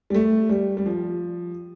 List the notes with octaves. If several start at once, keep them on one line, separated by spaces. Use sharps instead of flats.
G3
A3
G3
G3
F3